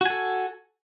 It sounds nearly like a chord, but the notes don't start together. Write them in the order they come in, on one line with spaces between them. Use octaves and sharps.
F#4 G#5 A4